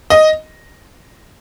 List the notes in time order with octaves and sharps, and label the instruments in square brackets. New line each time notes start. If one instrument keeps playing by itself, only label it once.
[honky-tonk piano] D#5